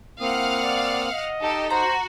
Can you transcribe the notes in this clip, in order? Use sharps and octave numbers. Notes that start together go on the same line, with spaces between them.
A#3 C4 E4 F5 F#5 D#6 F6
D5
D#5
D#4 G4 A4
F#4 C5 A#5